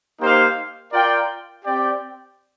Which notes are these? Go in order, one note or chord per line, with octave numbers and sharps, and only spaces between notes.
A#3 D#4 G4 C5 F5
F4 A#4 D5 G5
C4 G4 D5 G5